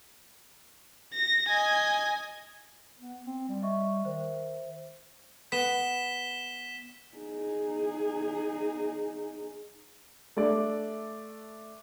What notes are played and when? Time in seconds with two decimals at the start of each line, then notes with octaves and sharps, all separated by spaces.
1.14 A#6
1.48 D#5 G#5
2.99 B3
3.26 C4
3.49 G3
3.62 D#5 E5 C#6
4.05 D#3 C5 E5
5.52 B3 B6 E7 G7
7.17 D#4 G#4
10.37 A3 D4 D5